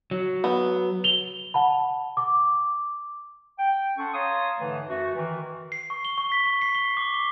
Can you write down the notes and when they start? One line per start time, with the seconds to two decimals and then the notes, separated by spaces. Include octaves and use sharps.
0.11 F#3
0.44 B3
1.04 F7 G7
1.54 F#5 A5 B5
2.17 D6
3.59 G5
3.97 C#4 A4 F#5 C6 C#6
4.14 C#5 F5 A5 A#5 C6 D#6
4.59 G#2 D3 E3 A3
4.88 F#2 A3 F#4
5.16 D#3 E3
5.72 C7
5.90 C#6
6.05 G7
6.18 C#6
6.32 B6
6.46 C#6
6.62 C7
6.75 G7
6.97 D6
7.14 G7